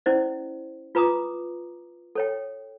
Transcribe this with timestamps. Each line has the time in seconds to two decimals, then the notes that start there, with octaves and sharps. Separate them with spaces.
0.06 C#4 E4 C5 D5
0.95 F4 B4 A#5 D6 D#6
2.15 A4 C#5 G5